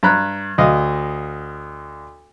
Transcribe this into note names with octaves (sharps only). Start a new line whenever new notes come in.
G2 A#5 B5 F#6
D2 D#5 F5